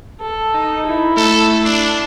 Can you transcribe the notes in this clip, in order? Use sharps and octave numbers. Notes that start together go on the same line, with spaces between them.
A4
D#4
E4
A3 A4
D4 C7